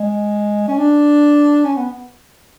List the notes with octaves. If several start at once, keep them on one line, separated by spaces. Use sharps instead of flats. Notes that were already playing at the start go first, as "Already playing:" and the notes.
Already playing: G#3
C#4
D4
C#4
B3